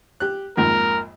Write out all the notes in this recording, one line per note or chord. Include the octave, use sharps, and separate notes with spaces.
G4 F#6
A#1 F2 G#2 A#4